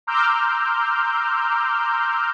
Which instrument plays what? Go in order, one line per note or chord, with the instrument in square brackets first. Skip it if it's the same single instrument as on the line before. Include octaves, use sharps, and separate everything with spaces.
[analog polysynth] A#5 C6 D6 E6 F6 G6